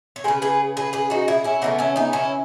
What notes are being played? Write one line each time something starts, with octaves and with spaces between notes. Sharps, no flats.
C#5
C#3 G#3 G#4 B4
G#4 B4
G#4 B4
G#4 B4
D#4 F#4
E4 G#4
C#4 E4
C#3 E3 A3 B3 D#4
C#4 E4
B3 D#4
C#4 E4